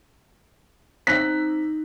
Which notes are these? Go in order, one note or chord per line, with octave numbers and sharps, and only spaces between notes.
C4 D#4 F#6 B6